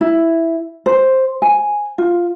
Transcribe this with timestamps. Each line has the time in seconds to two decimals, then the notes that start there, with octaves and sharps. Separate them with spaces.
0.01 E4
0.86 C5
1.42 G#5
1.98 F4